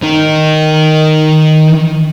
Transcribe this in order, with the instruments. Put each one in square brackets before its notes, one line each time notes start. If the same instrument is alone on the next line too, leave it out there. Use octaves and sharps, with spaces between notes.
[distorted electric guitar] D#3 D#4